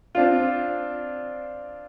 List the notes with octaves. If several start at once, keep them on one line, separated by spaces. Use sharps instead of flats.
C4 D4 F4